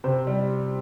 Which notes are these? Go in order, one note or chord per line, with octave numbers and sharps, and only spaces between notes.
C3 C5
G3